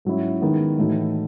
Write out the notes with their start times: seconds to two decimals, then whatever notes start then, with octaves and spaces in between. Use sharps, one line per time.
0.05 G#2 F#3 C#4 E4
0.42 D#3 G#3 B3 D#4
0.78 A2 E3 A3 D#4 F#4